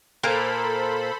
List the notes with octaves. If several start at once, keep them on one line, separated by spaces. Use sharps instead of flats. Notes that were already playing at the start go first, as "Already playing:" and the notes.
A#2 A#3 A4 A#4 C5 B5